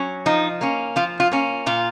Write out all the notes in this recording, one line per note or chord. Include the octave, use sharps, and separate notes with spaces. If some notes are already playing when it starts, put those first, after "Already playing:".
Already playing: F#3 C#4
F3 D#4
A#3 C#4
F3 F4
F4
A#3 C#4
A#2 F4